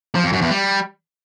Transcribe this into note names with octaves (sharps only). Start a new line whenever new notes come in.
F3
F2
F#2
E2
G3